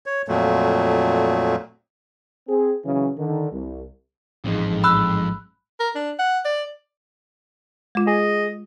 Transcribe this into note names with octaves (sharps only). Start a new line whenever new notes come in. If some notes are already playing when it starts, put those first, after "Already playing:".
C#5
F2 A#2 F#3 A3
C4 G#4
C#3 E3 F#3 C#4
D3 D#3
C2
A1 F2 G#2 G#3
B5 E6 F#6
A#4
D4
F#5
D5
G#3 F4
G#4 D#5